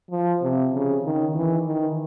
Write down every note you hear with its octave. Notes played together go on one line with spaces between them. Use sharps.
F3
C3
C#3
D#3
E3
D#3